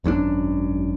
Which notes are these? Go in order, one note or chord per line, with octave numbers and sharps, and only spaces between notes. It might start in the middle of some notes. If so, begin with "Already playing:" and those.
G#1 F#2 C#4 D4